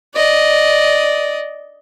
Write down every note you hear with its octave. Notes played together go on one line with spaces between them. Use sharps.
D5 D#5